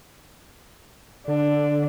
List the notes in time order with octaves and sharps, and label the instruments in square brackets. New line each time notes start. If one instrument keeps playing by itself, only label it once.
[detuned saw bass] D3 [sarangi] D4